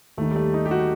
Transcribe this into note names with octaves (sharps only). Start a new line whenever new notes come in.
D#2 D#3 A3
G3
A3
D#4
G4
F#4